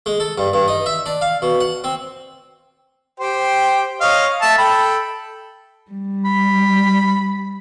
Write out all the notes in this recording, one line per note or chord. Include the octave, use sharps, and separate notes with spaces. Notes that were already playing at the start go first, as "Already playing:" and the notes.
G#3
A4
G2
G2
D#4
E5
D4
F5
B2
F#5
C4
G4 C5 G5
C#5 D#5 F5
E5 A5
A4 G5 B5
G3
B5